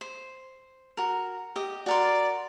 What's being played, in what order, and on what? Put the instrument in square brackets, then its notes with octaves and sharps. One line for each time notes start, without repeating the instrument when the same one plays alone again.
[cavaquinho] C5
F#4 A#4
G4 D#5
[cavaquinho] F#4 A#4 C6 [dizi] D5